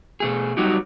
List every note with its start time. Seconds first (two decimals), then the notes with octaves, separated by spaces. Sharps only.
0.20 B2 A3 G#4
0.57 F#3 G3 D#4 F#4 G4